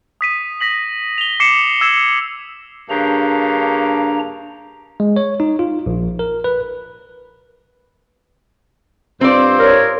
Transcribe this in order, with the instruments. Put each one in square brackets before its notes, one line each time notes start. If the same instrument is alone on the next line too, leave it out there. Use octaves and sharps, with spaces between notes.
[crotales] D#6 B6 D#7
A#6 B6 F#7
F7 G7
D6 C7 C#7 E7
E6 G#6 E7
[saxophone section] G2 C#3 A#3 [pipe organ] D4 A#5
[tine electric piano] G#3
C#5
D#4
F4
A#1
A#4
B4
[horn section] G2 F4 C5 [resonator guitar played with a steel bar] C4 D5
[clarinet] A#4 [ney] C#5